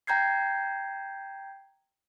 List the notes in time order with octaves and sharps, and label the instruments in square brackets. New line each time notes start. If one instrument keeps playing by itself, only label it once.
[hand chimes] G5 A#5 G6 G#6 C7